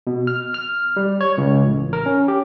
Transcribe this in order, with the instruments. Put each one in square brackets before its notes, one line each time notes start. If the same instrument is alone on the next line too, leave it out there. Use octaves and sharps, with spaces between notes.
[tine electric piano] B2
F6
F6
G3
C#5
C#2
A1
A#4
C#4
G4